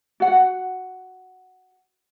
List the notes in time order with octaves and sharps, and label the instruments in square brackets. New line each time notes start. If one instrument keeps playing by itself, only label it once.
[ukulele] F#4 F#5